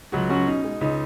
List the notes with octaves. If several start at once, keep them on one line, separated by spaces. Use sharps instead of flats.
C#2 F#3 F#4
F#3 C#4 F#4
B2 D#4
G#3
C#2 D#4